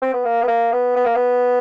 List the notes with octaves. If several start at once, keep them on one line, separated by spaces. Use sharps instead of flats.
C4
B3
A#3
B3
A#3
B3
B3
A#3
B3